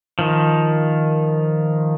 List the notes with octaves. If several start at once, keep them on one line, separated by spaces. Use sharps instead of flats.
D#3 F3